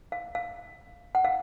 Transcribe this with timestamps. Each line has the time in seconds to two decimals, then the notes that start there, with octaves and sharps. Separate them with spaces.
0.12 F5
0.35 F5
1.15 F#5
1.25 F5